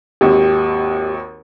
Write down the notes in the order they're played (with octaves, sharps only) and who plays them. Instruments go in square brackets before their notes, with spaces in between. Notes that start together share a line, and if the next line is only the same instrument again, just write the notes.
[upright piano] G#1 D#2 [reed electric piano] G4